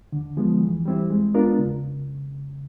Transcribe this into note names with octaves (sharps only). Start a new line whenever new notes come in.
D3
F3 G#3 B3
E3
G3 C4 E4
G#3
B3 D4 F4 A#4
C#3